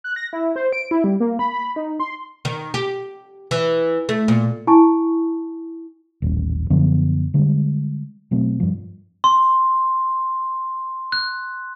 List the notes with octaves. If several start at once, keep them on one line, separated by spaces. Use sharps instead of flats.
F#6
A#6
E4
C5
D7
E4
G3
A#3
B5
B5
D#4
C6
D#3
G4
E3
A3
A#2
E4 G#5 A5 C#6
D#1 A1
F#2 D3 F3 B3
D3 G3 G#3
B2 F#3 A3 C4
G2 F3
C6
F#6